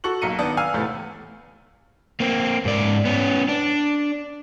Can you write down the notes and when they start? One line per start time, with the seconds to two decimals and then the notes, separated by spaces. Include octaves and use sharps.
0.04 F#4 A4 C#6 F#6 F#7
0.22 B1 A#3 C#7 D#7
0.39 D#3 B3 D4 A5 D#6
0.57 F5 G#5 E6 F6
0.74 E2 A2 C3 A3
2.20 A#3 C4
2.65 G#2 D5
3.05 B3 C#4
3.48 D4